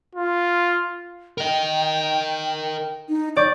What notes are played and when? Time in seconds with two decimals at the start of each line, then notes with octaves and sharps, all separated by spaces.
0.15 F4
1.38 A#4 D#5 G5
3.09 D#4
3.37 D5 C#6 G6